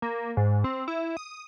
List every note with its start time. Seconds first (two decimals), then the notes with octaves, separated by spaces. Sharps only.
0.02 A#3
0.37 G#2
0.64 C4
0.88 E4
1.17 D#6